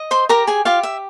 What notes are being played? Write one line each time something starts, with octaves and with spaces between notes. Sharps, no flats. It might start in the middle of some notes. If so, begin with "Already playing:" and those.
Already playing: D#5
C5 C6
G4 A#4 A#5
G#4 G#5
F4 G4 F5
E5